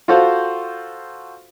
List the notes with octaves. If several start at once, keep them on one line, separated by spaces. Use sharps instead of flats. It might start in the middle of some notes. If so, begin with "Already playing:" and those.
F4 F#4 A4 C5 F5